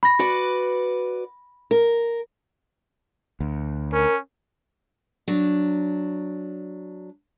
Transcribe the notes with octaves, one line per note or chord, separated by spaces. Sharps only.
B5 A#6
F#4 B4 D5
A#4
D2
C#4 A#4
F#3 D4